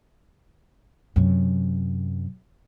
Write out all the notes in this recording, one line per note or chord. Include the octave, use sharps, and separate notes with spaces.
F#2 C3